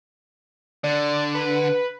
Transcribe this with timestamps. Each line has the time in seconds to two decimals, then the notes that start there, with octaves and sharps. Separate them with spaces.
0.84 D3 D5
1.35 B4